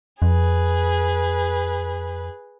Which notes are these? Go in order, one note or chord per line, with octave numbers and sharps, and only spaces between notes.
F2 G#4 B4